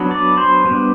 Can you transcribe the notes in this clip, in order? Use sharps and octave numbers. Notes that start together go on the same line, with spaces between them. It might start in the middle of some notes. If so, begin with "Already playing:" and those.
Already playing: F#3 B3 D4
D5
C5
G3 B3 D4